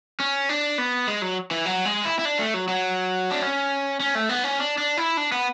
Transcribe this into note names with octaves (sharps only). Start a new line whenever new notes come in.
C#4
D4
B3
G#3
F#3
E3
F#3
G#3
E4
E4
D4
A3
F#3
F#3
D4
C#4
C#4
A3
B3
C#4
D4
D4
E4
D4
B3